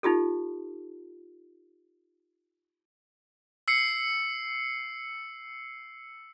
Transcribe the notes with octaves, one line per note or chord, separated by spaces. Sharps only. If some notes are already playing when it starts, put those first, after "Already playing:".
D#4 F4 G4 A4
E6 C7 C#7